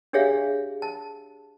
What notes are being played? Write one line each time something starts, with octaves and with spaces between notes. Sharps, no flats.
D4 G4 G#4 C#5 E5 F5
A5